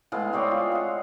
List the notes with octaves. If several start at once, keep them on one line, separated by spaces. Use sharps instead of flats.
A2 G#3 B3 F5
C4 G#4 C#5 D5
F4
D#5 F5 F#5